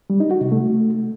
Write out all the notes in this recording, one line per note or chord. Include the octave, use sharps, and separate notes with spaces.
G3
D#4
F#4
C3
A3